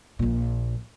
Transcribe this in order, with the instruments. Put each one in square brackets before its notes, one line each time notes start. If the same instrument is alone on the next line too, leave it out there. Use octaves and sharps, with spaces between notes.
[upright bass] A#1 A#2